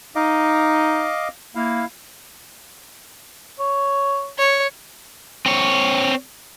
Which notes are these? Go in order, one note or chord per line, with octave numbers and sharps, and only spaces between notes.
D#4 D#5 F5 D6
A#3 E4 F5
C#5
C#5
C4 C#5